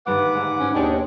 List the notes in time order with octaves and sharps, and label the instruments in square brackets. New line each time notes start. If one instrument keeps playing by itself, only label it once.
[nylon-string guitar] D2 G2 D#3 [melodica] B4 F#5 D6
[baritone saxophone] G#2
[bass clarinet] G#2 [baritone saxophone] C#4
[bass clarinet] D#2 [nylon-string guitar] B2 G#4 C#5 [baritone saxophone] D4 [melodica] C5 D#5 G5